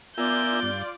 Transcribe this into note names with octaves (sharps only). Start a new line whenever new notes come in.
B3 F4 A#4 D5 E5 G#5 G6
G2